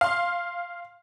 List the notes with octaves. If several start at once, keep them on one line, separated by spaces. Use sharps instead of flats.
F5 C6